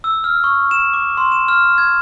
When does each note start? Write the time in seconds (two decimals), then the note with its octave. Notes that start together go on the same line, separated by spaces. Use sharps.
0.04 E6
0.24 F6
0.44 C#6
0.71 E7
0.94 D6
1.17 C6
1.32 E7
1.48 F6
1.78 G#6